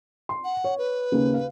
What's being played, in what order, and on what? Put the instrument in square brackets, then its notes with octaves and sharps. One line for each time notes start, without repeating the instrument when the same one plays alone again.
[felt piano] C6
[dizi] F#5
[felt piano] C#5
[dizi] B4
[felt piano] D#2 C#3 A#3
F5